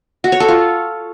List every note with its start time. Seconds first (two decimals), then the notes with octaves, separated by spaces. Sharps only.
0.24 F#4
0.32 C#5
0.40 A4
0.48 F4